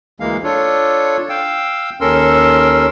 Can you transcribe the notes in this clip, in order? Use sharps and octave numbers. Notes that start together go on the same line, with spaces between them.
D2 E3 G#3 A#3 F5
D4 F4 A4 C#5
F5 G5 E6
D#2 C#4 A4 A#4 C6 E6